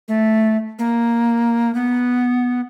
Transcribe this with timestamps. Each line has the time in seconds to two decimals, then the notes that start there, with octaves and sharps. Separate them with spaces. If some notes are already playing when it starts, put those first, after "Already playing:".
0.08 A3
0.79 A#3
1.75 B3